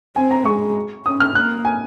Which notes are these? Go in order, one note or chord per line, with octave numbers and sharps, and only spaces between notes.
C4 G#5
A#5
G#3 C#6
C#4 D#6
F6
A#3 F#6
G#5